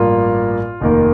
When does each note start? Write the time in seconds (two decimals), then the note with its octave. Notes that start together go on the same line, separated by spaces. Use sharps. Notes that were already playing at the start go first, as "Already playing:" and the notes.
Already playing: A1 G2 F3 A#3 F4
0.81 F1 D#2 D#3 A#3